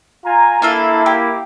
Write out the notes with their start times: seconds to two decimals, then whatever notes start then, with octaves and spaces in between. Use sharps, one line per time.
0.25 F4 G#5 A#5
0.62 A#3 D4 E4 F4 A4
1.06 G4